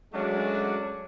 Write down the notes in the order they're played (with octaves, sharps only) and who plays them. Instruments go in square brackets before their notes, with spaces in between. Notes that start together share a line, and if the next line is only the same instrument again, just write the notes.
[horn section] F#3 G#3 A3 C#4 D4 F#4